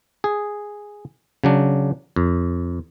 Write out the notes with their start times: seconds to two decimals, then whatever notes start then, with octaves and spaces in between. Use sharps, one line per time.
0.24 G#4
1.44 C#3 F#3 D4
2.16 F2